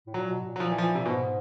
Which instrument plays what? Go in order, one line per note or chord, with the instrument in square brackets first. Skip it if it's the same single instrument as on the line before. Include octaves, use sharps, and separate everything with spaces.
[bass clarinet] A2
[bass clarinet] A#2 [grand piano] F#3
[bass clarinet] B2
A2
A#2
[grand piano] F#3
[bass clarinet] A#2 [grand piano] F3
[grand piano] E3
F3
E3
C3
[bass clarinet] G#2 [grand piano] B2